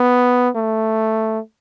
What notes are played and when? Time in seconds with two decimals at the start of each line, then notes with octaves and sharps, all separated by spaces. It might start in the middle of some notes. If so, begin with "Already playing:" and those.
Already playing: B3
0.56 A3